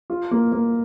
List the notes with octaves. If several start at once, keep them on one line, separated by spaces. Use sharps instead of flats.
F4
A#3
A#3